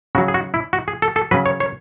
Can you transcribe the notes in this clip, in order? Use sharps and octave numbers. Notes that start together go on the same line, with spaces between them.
C#3 F#3 F#4
G#4
F#4
E4
F#4
G#4
A4
A4
C#3 F#3 B4
C#5
C#5